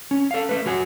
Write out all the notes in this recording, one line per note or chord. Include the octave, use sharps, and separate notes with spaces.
C#4
A4 F5
A3 B4
F#3 F#4 G#5